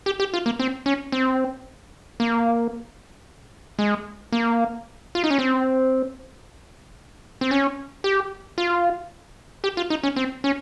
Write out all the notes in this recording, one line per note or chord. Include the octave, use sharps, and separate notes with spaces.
G4
G4
F4
A#3
C4
C#4
C4
A#3
G#3
A#3
F4
D#4
C#4
C4
C4
C#4
G4
F4
G4
F4
D#4
C#4
C4
C#4